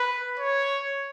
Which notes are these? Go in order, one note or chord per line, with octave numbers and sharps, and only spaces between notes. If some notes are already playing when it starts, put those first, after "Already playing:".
Already playing: B4
C#5